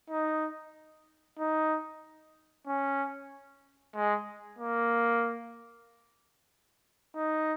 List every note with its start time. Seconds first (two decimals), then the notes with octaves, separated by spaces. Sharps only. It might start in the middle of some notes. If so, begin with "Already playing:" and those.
0.10 D#4
1.39 D#4
2.67 C#4
3.95 G#3
4.59 A#3
7.15 D#4